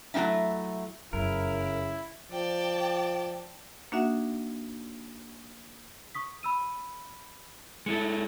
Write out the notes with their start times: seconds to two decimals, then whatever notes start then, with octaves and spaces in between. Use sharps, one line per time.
0.14 F#3 A3 C4 D#4 E4
1.13 F1 F#2 C#3 E4 A#4
2.32 F3 D5 G5 A5
3.92 A#3 D4 D#4 F#4 E5 F#5
6.15 C#6 D#6 B6
6.43 B5 E6 D#7
7.86 G#3 E4 A4 C#7